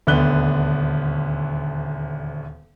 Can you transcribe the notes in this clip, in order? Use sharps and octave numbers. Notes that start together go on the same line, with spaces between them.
D#1 D2 D3 B3 F#6 G7